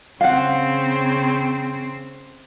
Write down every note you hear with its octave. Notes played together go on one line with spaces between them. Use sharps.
C#3 C4 F5 F#5